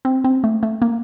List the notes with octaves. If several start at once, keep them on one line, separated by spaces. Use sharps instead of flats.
C4
C4
A3
A3
A#3